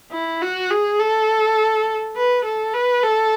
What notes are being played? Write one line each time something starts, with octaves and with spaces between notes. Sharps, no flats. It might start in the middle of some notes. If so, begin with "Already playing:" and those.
E4
F#4
G#4
A4
B4
A4
B4
A4